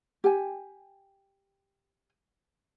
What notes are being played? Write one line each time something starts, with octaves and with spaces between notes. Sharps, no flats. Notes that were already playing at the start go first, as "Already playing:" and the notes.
G4 G5 G#5